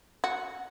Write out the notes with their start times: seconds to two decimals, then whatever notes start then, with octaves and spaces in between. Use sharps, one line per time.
0.24 F#4